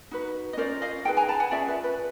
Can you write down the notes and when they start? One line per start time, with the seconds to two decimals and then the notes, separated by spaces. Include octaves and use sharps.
0.11 D#4 F#4 B4
0.53 D#5
0.57 C#4 F4 A#4 C5 D5
0.82 D#5 F5
1.05 D#4 G#4 B4 G5 A5
1.17 G#5 A#5
1.28 A5 B5
1.40 F#5 G#5
1.51 C#4 F4 G#4 D5 E5
1.68 B4
1.84 B4